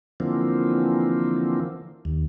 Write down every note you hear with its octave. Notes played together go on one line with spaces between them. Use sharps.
D3 E3 F3 A#3 C4
D#2